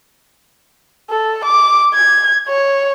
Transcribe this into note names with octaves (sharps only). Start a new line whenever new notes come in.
A4
D6
G#6
C#5